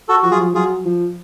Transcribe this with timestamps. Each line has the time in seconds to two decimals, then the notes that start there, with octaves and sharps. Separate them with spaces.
0.09 F#4 A4
0.23 F3 F#4
0.31 F#3 F4 G#4
0.40 F3
0.55 F#3 F4 G#4
0.85 F3